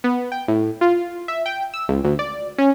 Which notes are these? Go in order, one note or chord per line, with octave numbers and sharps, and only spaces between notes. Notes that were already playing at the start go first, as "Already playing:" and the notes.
B3
G5
A2
F4
E5
G5
E6
C#2
D2
D5
C#4